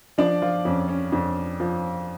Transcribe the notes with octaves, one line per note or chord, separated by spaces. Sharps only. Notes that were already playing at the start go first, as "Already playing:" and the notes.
F3 D4 D5
F3 F4
F2 C#4
C#4
F2 D4
F3